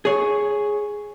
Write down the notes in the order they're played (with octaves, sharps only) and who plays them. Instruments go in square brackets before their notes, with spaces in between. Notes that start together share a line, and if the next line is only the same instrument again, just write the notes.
[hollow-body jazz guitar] G#4 C#5